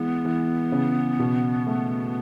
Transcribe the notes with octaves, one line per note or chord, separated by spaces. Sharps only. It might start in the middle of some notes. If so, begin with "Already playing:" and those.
Already playing: E3 G#3 B3
E3
C#3
B2
A3